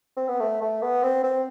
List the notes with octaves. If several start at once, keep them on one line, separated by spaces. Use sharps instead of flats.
C4
B3
A3
A3
B3
C4
C4